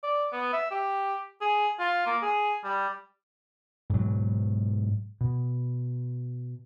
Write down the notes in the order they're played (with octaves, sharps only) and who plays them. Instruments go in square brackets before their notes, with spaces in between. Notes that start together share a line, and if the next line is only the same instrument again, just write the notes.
[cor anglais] D5
B3
E5
G4
G#4
F4
A#3
G#4
G3
[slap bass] G#2 B2 F#3
B2